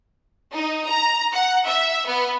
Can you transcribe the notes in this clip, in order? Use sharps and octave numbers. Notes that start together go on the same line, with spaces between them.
D#4
A#5
F#5
E5
B3